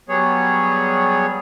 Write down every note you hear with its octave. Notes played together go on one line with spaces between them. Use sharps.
F#3 G3 B3 G#4 C#5